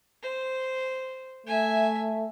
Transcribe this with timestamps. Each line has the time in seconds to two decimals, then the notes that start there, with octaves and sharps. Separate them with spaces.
0.23 C5
1.46 A3 E5 G#5